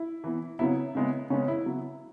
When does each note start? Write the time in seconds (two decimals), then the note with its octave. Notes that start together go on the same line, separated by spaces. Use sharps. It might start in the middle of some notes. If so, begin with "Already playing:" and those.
Already playing: E4
0.24 E3 B3
0.59 C#3 F#3 B3 E4
0.95 C#3 G#3 B3
1.30 C#3 G#3 B3 C#4
1.48 E4
1.66 C#3 F#3 B3